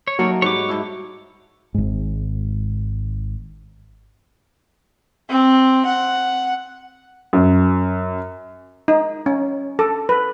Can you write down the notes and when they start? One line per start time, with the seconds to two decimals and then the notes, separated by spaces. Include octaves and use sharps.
0.07 C#5
0.19 F#3 A3 A#3 D#4 F#4 D5
0.42 G#2 G3 B4 C#5 D6
0.69 G#2 A3 E4
1.74 G#1 G#2
5.30 C4
5.86 F#5
7.33 F#2
8.88 D#4
9.26 C#4
9.79 A4
10.09 B4